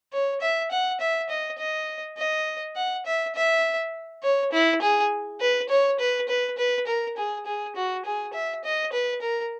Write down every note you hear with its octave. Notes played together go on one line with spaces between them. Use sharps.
C#5
E5
F#5
E5
D#5
D#5
D#5
F#5
E5
E5
C#5
E4
G#4
B4
C#5
B4
B4
B4
A#4
G#4
G#4
F#4
G#4
E5
D#5
B4
A#4